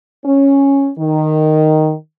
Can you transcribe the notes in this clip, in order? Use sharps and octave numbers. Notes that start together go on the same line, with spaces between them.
C#4
D#3